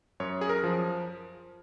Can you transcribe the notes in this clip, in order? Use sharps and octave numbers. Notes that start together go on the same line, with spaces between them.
F#2 C#5
G#4
A#4
F3